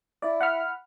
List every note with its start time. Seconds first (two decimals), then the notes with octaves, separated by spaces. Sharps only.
0.22 E4 D5
0.41 F#5 B5 F6